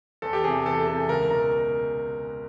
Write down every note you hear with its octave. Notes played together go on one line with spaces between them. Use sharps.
E2 A4
G4
C3 E3 G#4
E2 A4
C3 E3 A4
C#2 A#4
B2 A#4